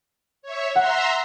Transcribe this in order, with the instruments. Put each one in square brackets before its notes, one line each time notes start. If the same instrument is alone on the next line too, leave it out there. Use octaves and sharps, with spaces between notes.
[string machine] C#5 E5
[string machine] E5 A#5 C6 [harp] F#5